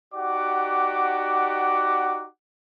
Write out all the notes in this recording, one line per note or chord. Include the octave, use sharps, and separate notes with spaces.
D#4 F#4 G4 D5 F#5 D6